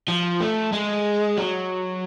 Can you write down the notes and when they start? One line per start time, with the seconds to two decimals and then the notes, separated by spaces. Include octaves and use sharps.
0.08 F3
0.40 A3
0.73 G#3
1.37 F#3